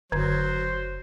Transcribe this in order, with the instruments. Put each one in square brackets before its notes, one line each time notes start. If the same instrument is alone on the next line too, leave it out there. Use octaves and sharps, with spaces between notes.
[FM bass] F#1 [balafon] D3 [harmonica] F#3 [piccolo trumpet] C5